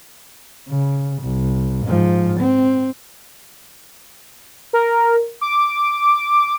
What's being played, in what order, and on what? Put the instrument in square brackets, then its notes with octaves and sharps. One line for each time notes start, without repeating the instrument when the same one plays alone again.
[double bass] C#3
C2
G#2 F3
C4
[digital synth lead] A#4
D6